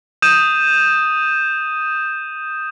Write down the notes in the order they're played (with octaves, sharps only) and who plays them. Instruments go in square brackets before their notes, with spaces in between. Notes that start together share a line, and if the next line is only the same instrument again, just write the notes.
[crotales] D#6 G6 D#7 E7